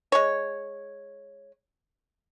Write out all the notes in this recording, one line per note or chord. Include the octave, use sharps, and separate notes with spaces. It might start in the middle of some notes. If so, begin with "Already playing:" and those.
G#3 C#5